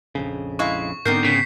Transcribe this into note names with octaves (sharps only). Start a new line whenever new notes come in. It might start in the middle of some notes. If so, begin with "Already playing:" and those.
A#1 F2 C#3
G#3 E4 F5 C#6
G#2 D3 B3 C4 D#4 A#4 G6 C7
C#3 B6